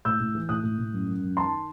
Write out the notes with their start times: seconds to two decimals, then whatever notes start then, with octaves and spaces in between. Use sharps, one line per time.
0.05 A2 E6 G6
0.20 A2
0.35 E3
0.49 A2 D#6 F#6
0.63 A2
0.78 A2
0.93 F#2
1.07 F#2
1.22 F#2
1.36 D#3 A5 C6